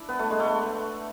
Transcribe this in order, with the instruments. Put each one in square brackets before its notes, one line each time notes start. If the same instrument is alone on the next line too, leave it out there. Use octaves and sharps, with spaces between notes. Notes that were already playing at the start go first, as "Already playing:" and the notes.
Already playing: [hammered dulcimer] D4 E4
B3
A3
G#3
A3